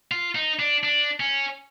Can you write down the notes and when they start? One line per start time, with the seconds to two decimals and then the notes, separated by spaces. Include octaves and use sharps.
0.11 F4
0.35 D#4
0.59 D4
0.84 D4
1.20 C#4